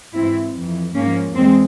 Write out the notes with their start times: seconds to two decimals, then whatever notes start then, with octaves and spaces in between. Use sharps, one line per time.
0.15 G#2 E3 C4 E4
0.55 F2 E3
0.95 G#2 F3 A#3 C#4
1.35 E2 G#3 C4